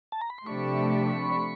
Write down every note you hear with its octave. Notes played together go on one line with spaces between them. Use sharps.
A5
A#5
B5
C6
C3 F3 A3 D4 G4 B5 C#6